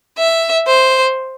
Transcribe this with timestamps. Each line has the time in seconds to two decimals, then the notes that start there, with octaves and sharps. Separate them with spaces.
0.18 E5
0.67 C5